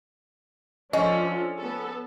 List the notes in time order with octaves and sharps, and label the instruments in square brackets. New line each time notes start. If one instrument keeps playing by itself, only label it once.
[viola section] F3 D4 A4 [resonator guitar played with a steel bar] C#4 [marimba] D#5
[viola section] B3 A4